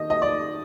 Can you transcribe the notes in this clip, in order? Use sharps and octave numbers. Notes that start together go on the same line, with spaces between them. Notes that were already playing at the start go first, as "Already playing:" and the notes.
Already playing: D#3 D#5
D#5
D5